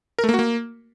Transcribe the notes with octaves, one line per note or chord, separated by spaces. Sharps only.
A#4
A3
A#3
F#4
A#3